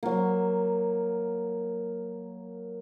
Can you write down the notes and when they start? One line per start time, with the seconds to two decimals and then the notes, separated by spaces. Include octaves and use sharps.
0.03 F#3 A#3